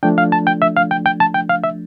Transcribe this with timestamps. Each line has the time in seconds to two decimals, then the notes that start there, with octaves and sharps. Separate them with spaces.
0.03 F3 A3 D4 G5
0.18 F5
0.32 A5
0.47 G5
0.62 E5
0.77 F5
0.91 G5
1.06 G5
1.20 A5
1.34 G5
1.49 F5
1.64 E5